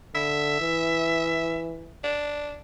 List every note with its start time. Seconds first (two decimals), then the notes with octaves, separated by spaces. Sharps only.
0.15 D3 E5
0.61 E3
2.04 D4